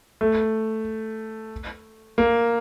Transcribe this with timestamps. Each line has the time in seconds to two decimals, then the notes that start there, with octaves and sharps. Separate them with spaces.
0.21 A3
2.18 A#3